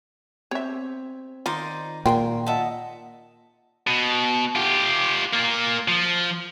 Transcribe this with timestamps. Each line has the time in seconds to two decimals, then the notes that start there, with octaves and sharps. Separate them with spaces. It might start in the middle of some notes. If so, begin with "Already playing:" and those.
0.51 C4 G4 C#5 E5
1.46 D#3 D#4 F4 C5 D5
2.06 A#2 G#3 A#4 G5 C6
2.47 D#5 E5 F#5 A5
3.87 B2
4.56 F4 G4
5.33 A#3 F4
5.88 F3